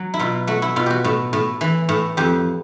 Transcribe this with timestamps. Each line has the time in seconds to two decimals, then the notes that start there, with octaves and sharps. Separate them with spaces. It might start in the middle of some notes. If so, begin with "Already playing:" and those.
Already playing: F#3
0.14 E4
0.20 B2 F4
0.47 A3 F#4
0.62 E4
0.76 B2 F4
0.86 F#4 G4
1.04 A2
1.33 A2
1.61 E3
1.89 A2
2.17 F2 G4